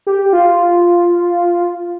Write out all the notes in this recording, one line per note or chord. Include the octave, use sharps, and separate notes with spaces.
G4
F4